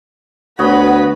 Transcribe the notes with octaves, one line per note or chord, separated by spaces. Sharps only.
D2 B3 F#4 C#5 D#5 F#5 B5